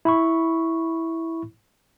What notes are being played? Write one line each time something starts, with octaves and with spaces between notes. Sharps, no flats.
E4 B5 C#6